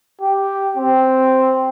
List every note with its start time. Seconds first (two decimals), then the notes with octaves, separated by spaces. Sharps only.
0.21 G4
0.77 C4